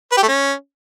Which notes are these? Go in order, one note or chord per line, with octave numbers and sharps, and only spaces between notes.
B4
G4
A3
C#4